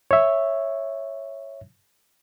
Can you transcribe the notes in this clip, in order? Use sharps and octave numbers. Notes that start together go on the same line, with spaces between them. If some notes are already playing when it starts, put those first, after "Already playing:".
C#5 E5